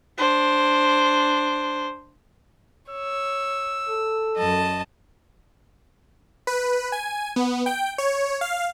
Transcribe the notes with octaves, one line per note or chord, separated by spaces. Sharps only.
D4 C5
C#5 E6
A4
F#2 D#5 A5
B4
G#5
B3
G5
C#5
F5